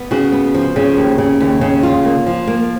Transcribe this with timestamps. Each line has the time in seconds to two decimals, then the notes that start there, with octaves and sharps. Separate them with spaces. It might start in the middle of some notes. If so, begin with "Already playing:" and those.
Already playing: B3
0.11 C#3 F#4
0.32 B3
0.54 F3
0.76 C#3
0.97 D#2
1.18 C#3
1.40 D#2
1.61 C#3
1.83 F4
2.05 A#3
2.26 F3
2.48 A#3